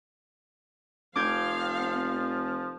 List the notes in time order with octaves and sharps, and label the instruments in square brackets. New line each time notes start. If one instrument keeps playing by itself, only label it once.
[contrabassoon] F1 [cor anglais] F3 [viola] C4 F5 [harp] D6 G6 G#6